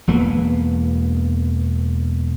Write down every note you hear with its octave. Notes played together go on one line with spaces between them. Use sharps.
E1 E2 A#3 B3